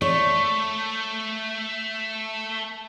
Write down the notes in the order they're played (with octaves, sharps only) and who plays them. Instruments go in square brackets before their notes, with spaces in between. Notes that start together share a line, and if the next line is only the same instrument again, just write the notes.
[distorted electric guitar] A3 [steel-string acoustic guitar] C#5